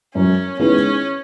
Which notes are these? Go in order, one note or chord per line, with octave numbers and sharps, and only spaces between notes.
F#2 C#4
D#3 G#3 B3 C#4 E4